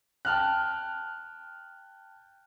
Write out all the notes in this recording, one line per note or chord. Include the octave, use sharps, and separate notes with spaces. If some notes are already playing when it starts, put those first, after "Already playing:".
G5 A5 F6 F#6